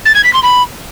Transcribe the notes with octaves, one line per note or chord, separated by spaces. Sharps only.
A6
G#6
B6
C6
B5